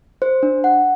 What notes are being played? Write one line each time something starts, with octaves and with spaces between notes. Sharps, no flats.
C5
D4
F#5